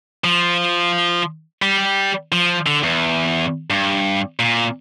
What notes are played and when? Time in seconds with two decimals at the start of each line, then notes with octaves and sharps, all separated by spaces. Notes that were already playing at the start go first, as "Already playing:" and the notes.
0.24 F3
1.62 G3
2.32 F3
2.66 D3
2.83 E2
3.70 G2
4.39 A#2